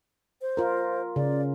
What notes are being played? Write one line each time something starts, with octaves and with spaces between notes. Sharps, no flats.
C5
F4 A#4
C#3 D5